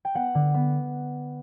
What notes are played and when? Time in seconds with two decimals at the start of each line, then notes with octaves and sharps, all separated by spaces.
0.05 G5
0.15 B3 F#5
0.35 D3
0.54 B3